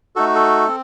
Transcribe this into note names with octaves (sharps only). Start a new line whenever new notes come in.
A3 D#4 F#4 A4
A4
C4